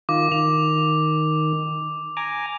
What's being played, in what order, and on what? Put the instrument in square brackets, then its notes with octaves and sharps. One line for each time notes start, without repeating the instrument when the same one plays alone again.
[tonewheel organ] D#3 F4 [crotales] D6
[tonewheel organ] D#3 [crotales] F7
[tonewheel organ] G#5 A#5 D6